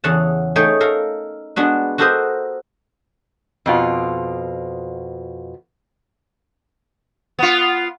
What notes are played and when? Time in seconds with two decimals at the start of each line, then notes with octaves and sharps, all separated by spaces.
0.04 E2 C#3 C#4 F#5 A5
0.56 A3 D#4 G#4 C#5 G5
0.80 A4 A#4 F5
1.56 G#3 B3 D4 F#4
1.98 F#4 G4 A4 A#4 C5 D#5
3.66 F2 B2 F4
7.39 B3 F4